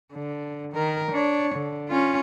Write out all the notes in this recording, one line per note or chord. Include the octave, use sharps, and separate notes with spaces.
D3
D#3 A#4
D4 C#5
D3
C#4 F4